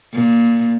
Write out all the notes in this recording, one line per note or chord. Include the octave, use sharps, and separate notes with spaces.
A#2